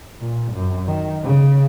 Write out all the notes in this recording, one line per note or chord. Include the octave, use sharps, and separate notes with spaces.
A#2
F#2
D#3
C#3